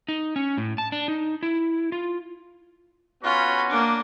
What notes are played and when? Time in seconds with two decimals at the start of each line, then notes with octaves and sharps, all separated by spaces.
0.08 D#4
0.36 C#4
0.58 A2
0.78 A5
0.92 D4
1.08 D#4
1.43 E4
1.92 F4
3.24 B3 C#4 F4 F#4 B5
3.70 A#3 D4